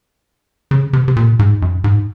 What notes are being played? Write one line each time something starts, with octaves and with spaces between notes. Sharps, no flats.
C#3
C3
C3
A#2
G#2
F#2
G#2